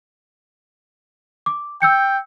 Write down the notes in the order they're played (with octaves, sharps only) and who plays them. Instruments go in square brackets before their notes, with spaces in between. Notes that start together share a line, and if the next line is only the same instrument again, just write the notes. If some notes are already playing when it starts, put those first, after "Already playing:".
[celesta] D6
[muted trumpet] G5 [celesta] E6 G6 C#7